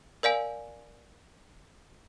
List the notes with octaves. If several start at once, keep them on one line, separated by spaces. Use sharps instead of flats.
A#4 D5 F5 G#5